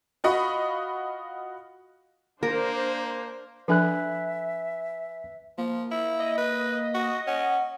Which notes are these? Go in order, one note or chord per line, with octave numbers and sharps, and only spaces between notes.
F4 F#4 D#5 B5 C#6
A#3 D4 A#4 C5
F3 D4 A4 B4 E5 G#5 F#6
F3 A#3
E4
D#5
B4
F#4
C#4 F#5